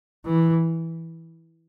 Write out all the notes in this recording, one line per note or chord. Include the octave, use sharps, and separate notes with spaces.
E3